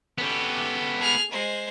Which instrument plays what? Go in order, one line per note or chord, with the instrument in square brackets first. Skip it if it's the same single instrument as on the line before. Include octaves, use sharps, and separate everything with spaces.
[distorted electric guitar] B3 G4 [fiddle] C#4 A4
[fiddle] G#4 F6
G#3 C5